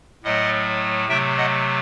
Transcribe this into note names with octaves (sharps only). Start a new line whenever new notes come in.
A2 F#3 A3 D#5 F#5
C3 F#3 A3 E5 G5
D#5 F#5